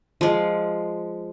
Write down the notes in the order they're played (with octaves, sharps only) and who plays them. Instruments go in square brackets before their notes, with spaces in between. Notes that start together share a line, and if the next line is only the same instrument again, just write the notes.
[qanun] F3 G#3